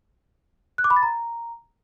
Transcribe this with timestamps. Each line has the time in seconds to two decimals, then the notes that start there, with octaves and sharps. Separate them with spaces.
0.78 F#6
0.84 D6
0.90 B5
0.96 A6
1.03 A#5